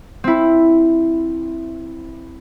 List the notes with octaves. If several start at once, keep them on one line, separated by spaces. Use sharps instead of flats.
C4 E4